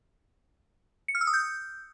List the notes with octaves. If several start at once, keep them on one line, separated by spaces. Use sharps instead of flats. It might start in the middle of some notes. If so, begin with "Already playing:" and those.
C#7
F6
E6
D#6
G6